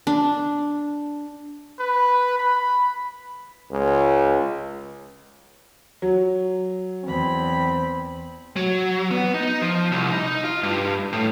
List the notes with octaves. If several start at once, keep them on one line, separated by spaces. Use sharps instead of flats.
D4
B4
B5
C#2
F#3
E2 C4 B5
F#3
B3
D#4
F3
C2
D#4
F4
G2
A2